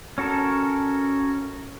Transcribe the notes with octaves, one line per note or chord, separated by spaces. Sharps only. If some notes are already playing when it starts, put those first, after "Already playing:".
C#4 F#4 A4 A#4 A5